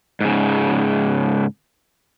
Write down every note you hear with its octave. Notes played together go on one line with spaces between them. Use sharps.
G#2 C#3